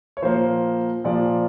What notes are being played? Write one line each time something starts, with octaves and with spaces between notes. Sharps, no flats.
C#5
A#2 F3 A#3 C5
A#2 F3 A#3 D5